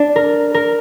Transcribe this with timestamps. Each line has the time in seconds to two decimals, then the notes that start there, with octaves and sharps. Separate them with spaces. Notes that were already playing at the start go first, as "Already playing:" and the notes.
Already playing: D4
0.16 A#4
0.54 A#4